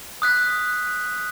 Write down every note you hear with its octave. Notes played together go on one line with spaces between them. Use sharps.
D#6 F#6 B6